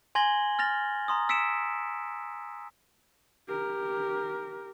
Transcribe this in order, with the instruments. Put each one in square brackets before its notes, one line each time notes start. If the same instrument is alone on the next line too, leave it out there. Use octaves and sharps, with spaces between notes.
[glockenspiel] G#5 C6 G#6 A#6 F#7 G7
F6 A6 A#6 F7
A#5 C6 D#6
E6 B6 C#7 D7 E7
[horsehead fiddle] G4 A#4